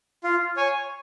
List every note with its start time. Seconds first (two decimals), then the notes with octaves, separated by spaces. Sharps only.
0.24 F4
0.57 C#5 G#5